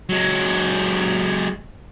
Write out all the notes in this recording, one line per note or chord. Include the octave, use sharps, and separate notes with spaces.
F#3 G#3